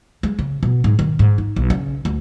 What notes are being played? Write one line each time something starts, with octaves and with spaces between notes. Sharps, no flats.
G#3
C#3
B2
G#2
D#3
G#2
D#4
B1
C#3
D2